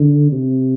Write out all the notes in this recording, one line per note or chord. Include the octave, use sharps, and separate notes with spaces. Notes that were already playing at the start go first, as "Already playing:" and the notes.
Already playing: D3
C3